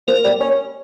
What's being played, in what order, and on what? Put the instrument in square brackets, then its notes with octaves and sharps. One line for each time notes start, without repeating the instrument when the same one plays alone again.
[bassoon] F3 [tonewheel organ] A#3 A#4
[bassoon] G3
C#4